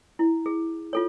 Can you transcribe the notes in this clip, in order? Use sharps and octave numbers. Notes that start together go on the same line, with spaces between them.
E4
G#4
F4 A4 C#5